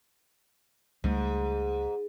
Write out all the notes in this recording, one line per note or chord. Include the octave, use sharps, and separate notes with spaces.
C#2 G#2 G3 A3